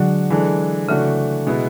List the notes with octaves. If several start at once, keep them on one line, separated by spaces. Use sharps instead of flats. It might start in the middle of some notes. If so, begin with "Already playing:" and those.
Already playing: D3 F#3 G#3 D4 F#4
E3 G#3 D4 A4
C#3 E3 A3 D4 F#4
B2 G#3 B3 E4